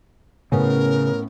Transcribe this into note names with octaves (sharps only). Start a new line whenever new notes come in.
A2 C#3 B3 C#4 A#4